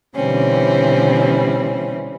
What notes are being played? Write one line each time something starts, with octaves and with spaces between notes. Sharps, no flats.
B2 D3 E3 G3 C4 C#4